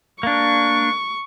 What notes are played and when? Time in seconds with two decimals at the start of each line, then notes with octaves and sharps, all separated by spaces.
0.23 A#3 D4 C#6